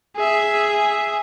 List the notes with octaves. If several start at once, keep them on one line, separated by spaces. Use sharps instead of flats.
G#4 E5